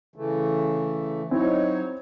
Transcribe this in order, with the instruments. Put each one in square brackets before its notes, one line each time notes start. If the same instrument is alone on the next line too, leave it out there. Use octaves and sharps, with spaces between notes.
[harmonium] C#3 E3 A3
[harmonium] F#3 D#4 C#5 [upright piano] C4 E4